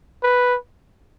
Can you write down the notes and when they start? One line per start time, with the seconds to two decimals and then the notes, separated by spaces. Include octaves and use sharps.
0.23 B4